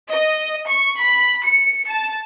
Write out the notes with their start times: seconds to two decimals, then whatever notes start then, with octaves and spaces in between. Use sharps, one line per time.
0.10 D#5
0.68 C#6
0.98 B5
1.45 C#7
1.88 A5